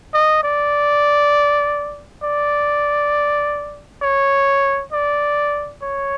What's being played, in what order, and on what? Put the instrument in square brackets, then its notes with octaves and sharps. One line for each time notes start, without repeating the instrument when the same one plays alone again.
[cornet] D#5
D5
D5
C#5
D5
C#5